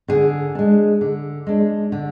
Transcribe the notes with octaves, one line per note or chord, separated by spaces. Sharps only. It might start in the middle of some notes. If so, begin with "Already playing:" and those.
D3 G#4
G#3 D4
D3
G#3 D4
D3